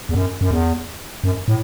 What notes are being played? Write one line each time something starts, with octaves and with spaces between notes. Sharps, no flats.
E2
F#2
F#2
E2
F#2
A2